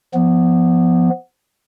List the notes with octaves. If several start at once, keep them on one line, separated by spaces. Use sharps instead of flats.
F3 B3